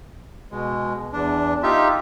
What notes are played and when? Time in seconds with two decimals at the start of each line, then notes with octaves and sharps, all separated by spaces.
0.51 B2 G#3
1.13 E2 D4
1.63 D#4 F4 G4 E5